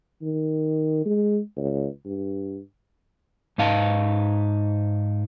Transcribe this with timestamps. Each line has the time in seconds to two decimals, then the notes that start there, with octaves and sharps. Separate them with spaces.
0.22 D#3
1.06 G#3
1.57 C#2
2.06 G2
3.58 G#2 D#4 F5 A5